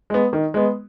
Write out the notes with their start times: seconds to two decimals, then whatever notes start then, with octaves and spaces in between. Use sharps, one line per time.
0.10 G#3 B3
0.33 D#3
0.54 G#3 B3